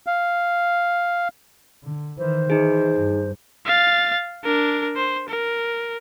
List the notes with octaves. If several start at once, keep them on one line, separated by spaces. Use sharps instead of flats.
F5
D3
D#3 E3 C5
E3 D#4 G#4
G2
F5 A6
D4 A#4
C5
A#4